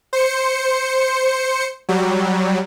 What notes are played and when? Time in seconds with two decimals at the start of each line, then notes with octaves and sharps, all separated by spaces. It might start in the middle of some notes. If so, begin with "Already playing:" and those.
0.13 C5 C#7
1.89 F#3 G3